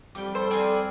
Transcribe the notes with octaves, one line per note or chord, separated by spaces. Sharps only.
F2 G3 G4 G5
A4 C5
C4 F4 G#4 D5 G#5